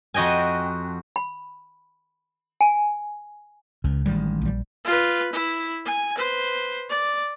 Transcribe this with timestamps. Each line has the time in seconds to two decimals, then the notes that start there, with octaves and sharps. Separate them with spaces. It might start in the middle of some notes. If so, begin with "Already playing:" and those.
0.14 F2 F#4 D#5 G5 G#5
1.16 B5
2.61 G#5
3.84 C#2 C#3
4.06 A1 D#3 G3 G#3
4.42 A#1 G3
4.85 F4 B4
5.33 E4
5.86 G#5
6.16 B4 C5
6.90 D5